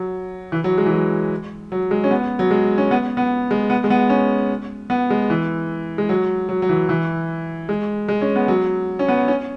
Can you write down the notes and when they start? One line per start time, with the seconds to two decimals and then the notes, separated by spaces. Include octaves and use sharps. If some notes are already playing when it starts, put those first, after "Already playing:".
Already playing: F#3
0.52 E3
0.64 F#3
0.78 G#3
0.86 E3
0.91 F#3
1.72 F#3
1.91 G#3
2.04 C#4
2.11 B3
2.39 F#3
2.51 G#3
2.78 C#4
2.91 B3
3.17 B3
3.51 G#3
3.70 B3
3.84 G#3
3.90 B3
4.10 C#4
4.90 B3
5.10 G#3
5.30 E3
5.98 G#3
6.09 F#3
6.49 F#3
6.62 F#3
6.69 E3
6.89 E3
7.69 G#3
8.08 G#3
8.21 C#4
8.36 B3
8.48 F#3
8.99 C#4
9.08 B3
9.28 C#4